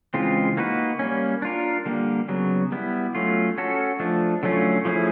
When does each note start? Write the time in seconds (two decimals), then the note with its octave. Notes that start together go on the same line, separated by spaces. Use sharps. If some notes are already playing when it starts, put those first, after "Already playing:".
0.14 C#3 E3 G#3 C4 F4
0.57 A#3 D#4 F#4 B4
0.99 G3 A#3 C#4
1.42 D4 F4 A#4
1.85 D3 G3 A#3
2.28 C#3 F#3 B3
2.72 G3 B3 E4
3.15 F#3 A3 C#4 F4
3.58 C#4 F#4 A4
4.00 F3 A3 D4
4.43 D3 F#3 A3 C#4 F4
4.85 F3 A3 C#4 E4 G#4